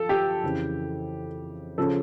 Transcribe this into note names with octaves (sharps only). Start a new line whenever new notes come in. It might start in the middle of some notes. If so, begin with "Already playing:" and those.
Already playing: F3 F4 A4
G4
F2 C#3 E3
C#3 F3 C#4 A4